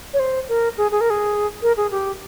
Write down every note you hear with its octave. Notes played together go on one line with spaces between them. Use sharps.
C#5
C5
A#4
G#4
G#4
A#4
G#4
A#4
G#4
G4